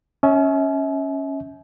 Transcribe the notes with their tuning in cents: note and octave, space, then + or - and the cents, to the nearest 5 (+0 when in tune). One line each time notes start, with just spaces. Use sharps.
C#4 -5 E5 -35 G#5 +45